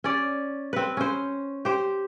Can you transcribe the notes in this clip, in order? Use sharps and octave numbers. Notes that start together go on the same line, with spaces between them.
C#4 D5
C4 B4
C#4 C5
G4 C5